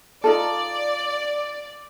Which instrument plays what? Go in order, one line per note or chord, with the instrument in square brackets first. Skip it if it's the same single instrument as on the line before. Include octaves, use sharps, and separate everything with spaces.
[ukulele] D#4 F4 A4 [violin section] D5